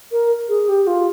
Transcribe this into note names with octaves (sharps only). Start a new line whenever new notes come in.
A#4
G#4
G4
F4